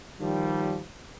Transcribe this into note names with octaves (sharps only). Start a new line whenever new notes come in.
D#3 F3 G3